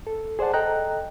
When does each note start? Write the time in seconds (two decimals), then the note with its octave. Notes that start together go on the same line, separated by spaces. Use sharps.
0.07 A4
0.39 G#4 C5 D5 F#5 A5
0.54 A4 D#5 G5 A#5 F#6